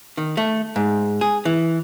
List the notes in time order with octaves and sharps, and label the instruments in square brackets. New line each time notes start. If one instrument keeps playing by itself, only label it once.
[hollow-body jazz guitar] D#3
A3
G#2
G#4
E3